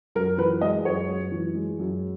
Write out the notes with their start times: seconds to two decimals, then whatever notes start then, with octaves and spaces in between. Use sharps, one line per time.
0.15 F#2 A#4
0.38 E3 B4
0.61 G#3 D#5
0.85 F#2 C#5
1.09 F#2
1.32 E3
1.55 G#3
1.79 F#2